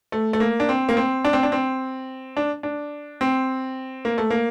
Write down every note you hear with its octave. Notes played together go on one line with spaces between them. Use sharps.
A3
A3
A#3
D4
C4
A#3
C4
D4
C4
D4
C4
D4
D4
C4
A#3
A3
A#3